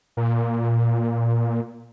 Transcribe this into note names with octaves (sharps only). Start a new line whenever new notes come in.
A#2